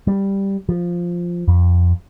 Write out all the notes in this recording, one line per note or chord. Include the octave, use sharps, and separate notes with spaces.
G3
F3
F2